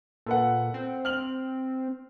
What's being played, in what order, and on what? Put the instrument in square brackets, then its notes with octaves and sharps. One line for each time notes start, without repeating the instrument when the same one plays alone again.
[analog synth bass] A#2 [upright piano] A4 B4 F#5
[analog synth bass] C4
[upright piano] F6 F#7